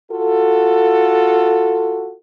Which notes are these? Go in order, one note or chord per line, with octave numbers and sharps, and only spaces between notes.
F4 F#4 A4